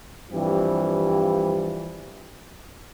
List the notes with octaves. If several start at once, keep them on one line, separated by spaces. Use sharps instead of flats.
G2 E3 F3 C4 G4